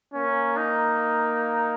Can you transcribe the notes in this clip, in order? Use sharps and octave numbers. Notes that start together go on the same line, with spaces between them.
A#3 C#4
D#4